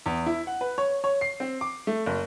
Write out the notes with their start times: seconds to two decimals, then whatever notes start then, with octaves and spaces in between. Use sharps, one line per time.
0.06 E2
0.26 E4
0.47 F#5
0.61 B4
0.78 C#5
1.04 C#5
1.21 C7
1.40 C4
1.61 D6
1.87 A3
2.06 F#1